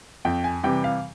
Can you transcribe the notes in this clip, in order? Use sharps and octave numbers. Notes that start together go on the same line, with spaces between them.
F2 G5
G#5
C3 E3 G3 G5
F5